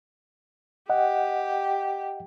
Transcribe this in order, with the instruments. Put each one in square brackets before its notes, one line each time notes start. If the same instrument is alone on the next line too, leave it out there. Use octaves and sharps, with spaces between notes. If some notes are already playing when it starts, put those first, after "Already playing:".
[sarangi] G4 [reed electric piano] D#5 F#5